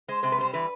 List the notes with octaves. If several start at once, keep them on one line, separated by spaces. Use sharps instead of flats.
G#3 C5
C3 C5
B4
G3 C5
E3 B4